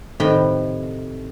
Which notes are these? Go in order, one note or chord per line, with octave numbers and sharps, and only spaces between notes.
A2 C3 D#3 B4 G5